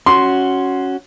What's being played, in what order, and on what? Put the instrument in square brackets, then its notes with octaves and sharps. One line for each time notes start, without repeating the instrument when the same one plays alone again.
[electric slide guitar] C#4 F#4 [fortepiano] C6